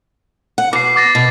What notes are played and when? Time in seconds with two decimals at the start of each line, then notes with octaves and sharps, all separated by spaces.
0.58 F#5
0.73 B2 D6 C7
0.96 D6 A6 A#6
1.15 B2